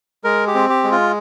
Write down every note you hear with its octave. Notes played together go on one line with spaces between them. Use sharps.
G#3 A#4
G4
C4
G4
G#3
F4